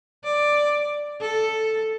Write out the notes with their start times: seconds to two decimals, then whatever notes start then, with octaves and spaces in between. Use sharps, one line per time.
0.24 D5
1.21 A4